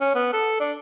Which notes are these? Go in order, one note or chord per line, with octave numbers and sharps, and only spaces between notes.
C#4
B3
A4
D4